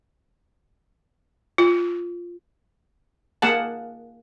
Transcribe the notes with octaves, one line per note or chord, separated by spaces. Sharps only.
F4
A#3 G#4 F#5 A5